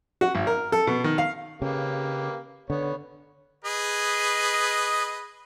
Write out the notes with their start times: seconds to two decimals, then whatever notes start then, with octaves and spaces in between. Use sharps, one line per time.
0.21 F#4
0.35 G#1
0.47 A#4
0.72 A4
0.87 B2
1.04 D#3
1.18 F5
1.62 C#3 A#3 G4 B4
2.70 D3 B3 C#5
3.64 G#4 B4 D#5